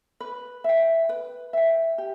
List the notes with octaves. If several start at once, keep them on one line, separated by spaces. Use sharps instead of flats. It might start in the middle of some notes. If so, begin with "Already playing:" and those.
B4
E5 G5
B4
E5 G5
G4